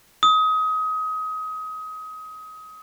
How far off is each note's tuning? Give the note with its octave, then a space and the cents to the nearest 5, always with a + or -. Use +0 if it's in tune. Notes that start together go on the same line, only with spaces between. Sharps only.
D#6 +25